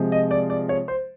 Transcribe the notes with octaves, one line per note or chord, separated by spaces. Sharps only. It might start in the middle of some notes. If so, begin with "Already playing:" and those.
Already playing: C3 F3 G#3
D#5
D5
D5
C#5
C5